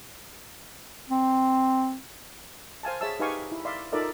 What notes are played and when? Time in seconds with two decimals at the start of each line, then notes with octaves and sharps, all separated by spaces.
1.10 C4
2.83 C5 F5 G#5 A5
3.01 G#4 C#5 E5 A5 E6
3.20 D#4 G4 B4 F5 G#5 C#6
3.52 E4
3.65 D5 E5 F5 C6
3.92 D#4 F4 A4 A#4 D5 E5